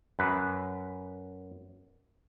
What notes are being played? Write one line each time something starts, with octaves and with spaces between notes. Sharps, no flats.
F#2 B4